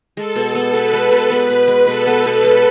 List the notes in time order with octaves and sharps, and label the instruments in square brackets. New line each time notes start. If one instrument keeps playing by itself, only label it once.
[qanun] G#3 [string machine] A4
[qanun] B2
B3
[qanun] B2 [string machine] B4
[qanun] G#3
B2
B3
B2
G#3
[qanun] B2 [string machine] A4
[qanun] B3
B2
G#3